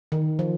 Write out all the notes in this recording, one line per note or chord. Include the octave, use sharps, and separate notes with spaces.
D#3
F3